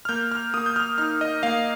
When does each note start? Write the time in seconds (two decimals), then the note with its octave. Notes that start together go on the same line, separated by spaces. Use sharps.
0.05 F6
0.09 A#3 G6
0.32 F6
0.54 A#3 D#6
0.66 G6
0.76 F6
0.98 D#4 F6
1.21 D#5
1.43 A#3 F5